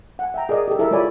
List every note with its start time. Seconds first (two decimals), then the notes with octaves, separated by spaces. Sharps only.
0.19 F#5 G#5
0.34 E5 G5 A#5
0.49 G#4 A#4 D5 D#5
0.68 G4 A4
0.79 E4 A4 A#4 E5
0.91 G#3 F4 C#5 D5 G#5 B5